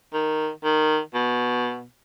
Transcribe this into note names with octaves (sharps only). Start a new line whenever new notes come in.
D#3
D#3
B2